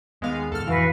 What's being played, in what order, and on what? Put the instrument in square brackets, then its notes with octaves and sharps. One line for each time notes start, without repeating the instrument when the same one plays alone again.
[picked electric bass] D#2 [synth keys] G#3 B3 F5
[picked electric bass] D#2 G#2 D3 [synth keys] A4 F6
[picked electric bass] D1 F2 [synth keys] E3 [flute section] F#4 B4 F5